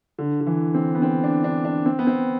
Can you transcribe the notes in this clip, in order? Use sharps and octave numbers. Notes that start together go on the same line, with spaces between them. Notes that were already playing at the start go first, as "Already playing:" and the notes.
D3
D3
E3
C4
B3
C4
D4
D4
D4
C4
B3
C4